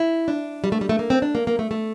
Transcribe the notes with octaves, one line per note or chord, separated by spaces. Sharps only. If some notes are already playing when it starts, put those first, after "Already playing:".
Already playing: E4
D4
G3
A3
G3
A3
A#3
C4
D4
A#3
A#3
A3
A3